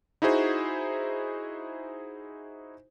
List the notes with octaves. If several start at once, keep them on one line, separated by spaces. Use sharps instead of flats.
D#4 E4 F#4 G#4 C5